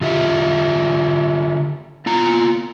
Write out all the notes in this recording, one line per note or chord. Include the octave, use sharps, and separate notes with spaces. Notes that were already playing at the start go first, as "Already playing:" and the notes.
D3 F4 G4 E5
B3 F4 A#5